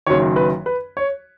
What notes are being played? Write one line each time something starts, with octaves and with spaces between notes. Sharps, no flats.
F#1 F#2 D#3 C#5
B4
B4
C#5